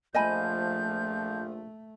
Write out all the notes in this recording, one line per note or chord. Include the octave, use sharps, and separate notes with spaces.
A#1 F3 A3 D#5 G#5 B5 G6